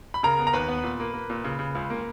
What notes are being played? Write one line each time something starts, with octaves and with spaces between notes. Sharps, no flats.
B5
C#3 A#4 A#5
B3
A#5
D#2 B4 B5
B3
A#2
A#3
A#3
A#2
C#3
C#3
C#2
A#3